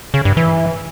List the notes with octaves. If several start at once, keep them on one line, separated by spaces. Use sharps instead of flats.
C#3
G2
E3